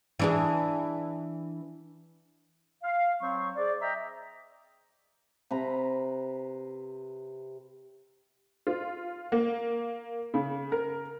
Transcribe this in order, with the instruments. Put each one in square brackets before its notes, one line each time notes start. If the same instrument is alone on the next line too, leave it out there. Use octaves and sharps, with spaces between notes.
[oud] E3 D4 G#4
[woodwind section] F5
F#3 C4 C5 C#6
G#4 C5 D5
D#5 E5 G5 A#5
[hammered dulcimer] C3 B4 A#5
[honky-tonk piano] F4
A#3
C#3
A#4